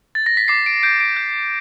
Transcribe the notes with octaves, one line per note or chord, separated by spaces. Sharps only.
A6
A#6
B6
D6 C7
D7
G6 D7
D7
G6